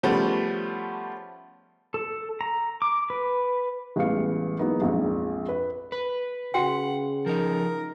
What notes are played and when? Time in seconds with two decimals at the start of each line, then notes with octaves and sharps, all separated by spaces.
0.03 C#3 F3 G3 A3 B3 C#4
1.94 A4
2.41 A#5
2.82 D6
3.10 B4
3.96 A1 G3 G#3 B3 F5 C#7
4.59 F#3 G#3 A#3 B3 D#4 E4
4.82 A#1 F2 F3 G#3
5.49 B4
5.92 B4
6.54 C#3 F#4 F#5 G5
7.26 F3 D#4 A#4